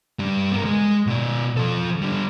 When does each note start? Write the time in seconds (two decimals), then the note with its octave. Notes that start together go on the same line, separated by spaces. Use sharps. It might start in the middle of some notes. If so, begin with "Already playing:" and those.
0.19 G2 G3
0.52 B3 A#4
0.65 G#3
1.07 B2 D5
1.57 F3 A4
2.02 D3 G3